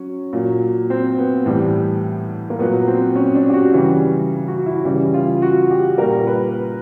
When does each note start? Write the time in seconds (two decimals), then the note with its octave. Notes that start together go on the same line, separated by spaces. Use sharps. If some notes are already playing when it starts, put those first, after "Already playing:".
Already playing: F#3 C#4
0.33 A#2 F#3
0.90 C4
1.18 B3
1.46 A2 E3 G3
2.50 A#3
2.59 A#2 F#3 B3
2.87 C4
3.16 C#4
3.35 D4
3.49 G4
3.53 F#4
3.73 C#3 E3 G3
4.48 F#4
4.66 E4
4.85 C#3 E3 G3
5.14 F4
5.42 F#4
5.71 G4
5.98 A#2 G3 A#4
6.27 B4